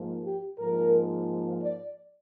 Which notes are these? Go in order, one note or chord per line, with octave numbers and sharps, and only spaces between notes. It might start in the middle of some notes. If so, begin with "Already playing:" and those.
Already playing: G#2 F3 A#3
G4
G#2 F3 A#3 A#4
D5